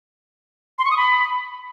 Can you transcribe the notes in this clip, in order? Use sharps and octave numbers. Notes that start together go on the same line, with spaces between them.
C6
C#6
D#6
B5